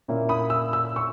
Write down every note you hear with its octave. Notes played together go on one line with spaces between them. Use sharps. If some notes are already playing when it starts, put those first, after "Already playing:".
A#2 A#3 C#4 E4
B5 D#6
E6
E6
C#6 E6